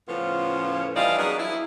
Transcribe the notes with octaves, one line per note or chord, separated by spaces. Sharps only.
A2 C#3 F3 B3 C#4 F4
E3 F3 G3 D5 D#5 F5
F#3 A#3 B3 D4 G#4
E4